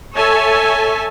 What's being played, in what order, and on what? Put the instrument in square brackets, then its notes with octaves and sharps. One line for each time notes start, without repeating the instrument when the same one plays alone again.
[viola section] A4 C#5 E5 G#5 A5